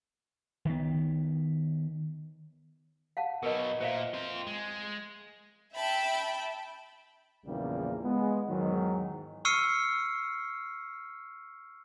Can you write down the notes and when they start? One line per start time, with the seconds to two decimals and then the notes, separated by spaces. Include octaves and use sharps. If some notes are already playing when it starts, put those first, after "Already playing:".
0.65 D#3 B3
3.17 F5 F#5 A5
3.43 B2 F#3 A#4 B4 D#5
3.80 A#2 C5 E5 F5
4.14 C4 F4
4.47 G#3
5.75 E5 G5 A5 B5
7.46 A#1 E2 C#3 F3 G3 A#3
8.03 G#3 B3
8.48 E2 G#2 D#3 F#3
9.45 C#6 E6 F6 C7 C#7 D#7